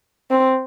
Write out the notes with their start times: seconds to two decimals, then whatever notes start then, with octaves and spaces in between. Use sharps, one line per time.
0.31 C4